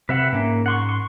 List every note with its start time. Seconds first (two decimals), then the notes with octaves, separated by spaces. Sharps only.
0.09 C3 C4 B4 E5 F#5
0.33 G#2 A#3 C#4
0.66 F#5 C6 C#6
0.89 C6 C#6